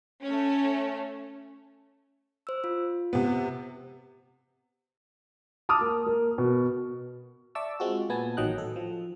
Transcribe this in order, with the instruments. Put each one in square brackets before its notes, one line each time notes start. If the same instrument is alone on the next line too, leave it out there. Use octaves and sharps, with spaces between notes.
[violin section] A3 C#4
[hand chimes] C5 E6
F4
[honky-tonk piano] C3 B3
[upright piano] A5 D6 D#6 F6
A#3
A#3
B2
[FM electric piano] D5 E5 A5 C#6 D6 E6
G#3 C4 F4 F#4
A#2 B3 G#5 A5
A1 D#3 F#3 D#5 G5 F#6
A4
F3